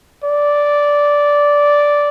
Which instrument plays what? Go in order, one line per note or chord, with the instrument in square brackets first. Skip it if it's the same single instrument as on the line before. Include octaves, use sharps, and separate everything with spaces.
[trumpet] D5